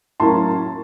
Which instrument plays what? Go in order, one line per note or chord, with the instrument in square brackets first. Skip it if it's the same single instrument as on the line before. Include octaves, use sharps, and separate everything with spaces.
[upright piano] A2 F#3 A#3 C#4 A5 C6